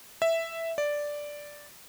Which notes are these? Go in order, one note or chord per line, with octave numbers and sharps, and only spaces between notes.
E5
D5